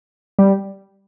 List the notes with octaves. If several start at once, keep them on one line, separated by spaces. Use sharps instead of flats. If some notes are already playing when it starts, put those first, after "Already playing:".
G3